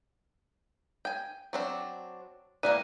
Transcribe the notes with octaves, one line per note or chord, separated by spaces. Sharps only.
G5 G#5
F#3 C4 D4
E3 G3 A#3 D5 F#6 D#7